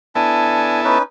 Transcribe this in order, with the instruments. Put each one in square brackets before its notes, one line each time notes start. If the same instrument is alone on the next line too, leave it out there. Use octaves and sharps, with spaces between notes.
[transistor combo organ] B3 E4 A4 [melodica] D4 G#5
[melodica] C#4 D#4 B4